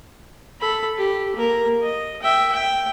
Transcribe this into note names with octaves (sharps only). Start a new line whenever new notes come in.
A4 B5
G4
A#3 A#4
D#5
E5 G5
G5